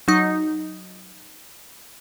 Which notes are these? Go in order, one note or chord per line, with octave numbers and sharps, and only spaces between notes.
F#3 D#4